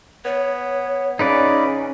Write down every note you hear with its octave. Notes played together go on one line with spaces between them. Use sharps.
B3 C#5
C#3 C#4 D#4 B4 D5